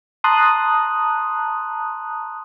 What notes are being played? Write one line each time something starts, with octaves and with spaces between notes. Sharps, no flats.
A5 A#5 C6 D#6 F#6